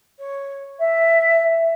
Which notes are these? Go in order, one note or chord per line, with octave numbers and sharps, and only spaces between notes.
C#5
E5